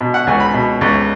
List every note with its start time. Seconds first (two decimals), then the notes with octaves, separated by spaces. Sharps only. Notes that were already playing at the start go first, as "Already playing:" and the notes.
0.01 B2
0.14 F#5
0.27 C#2 G#5
0.40 B5
0.53 B2
0.81 C#2